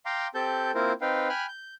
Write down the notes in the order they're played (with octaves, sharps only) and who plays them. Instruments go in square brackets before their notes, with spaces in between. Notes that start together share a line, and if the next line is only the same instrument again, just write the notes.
[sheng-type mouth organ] F5 G5 A#5 C6 D6
C4 G4 A4 A5 G6
A#3 C4 E4 F4 A#4 C5
C4 D#4 B4 F5 G5
G5 G#5 B5 F6 F#6
G6